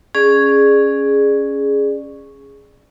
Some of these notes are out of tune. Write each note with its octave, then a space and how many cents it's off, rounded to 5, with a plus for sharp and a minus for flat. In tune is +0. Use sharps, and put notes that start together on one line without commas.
C#4 +0 G#4 +0 D5 +20